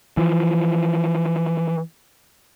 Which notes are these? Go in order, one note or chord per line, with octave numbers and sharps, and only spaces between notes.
E3 F3